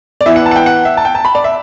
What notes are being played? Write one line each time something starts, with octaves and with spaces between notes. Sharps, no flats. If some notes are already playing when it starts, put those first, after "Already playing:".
D5
E3 B3 E4 E5
F#5
A5
F#5
G5
F#5
E5
A5
G5
A5
B5
D5
E5